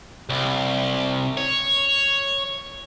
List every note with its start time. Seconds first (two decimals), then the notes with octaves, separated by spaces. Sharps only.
0.29 C2
1.37 C#5